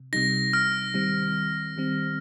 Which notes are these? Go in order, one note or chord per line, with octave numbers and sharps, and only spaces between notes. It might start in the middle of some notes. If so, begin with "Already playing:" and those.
Already playing: C3
C3 G3 D#4 A#6
F6
D#3 G3 C4
D#3 G3 C4